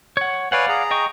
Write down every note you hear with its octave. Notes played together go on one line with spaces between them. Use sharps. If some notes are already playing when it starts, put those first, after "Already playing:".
C#5 F#5
B4 C#5 D5 F5 F#5 G#5
G#4 A#5
D#5 G5 C#6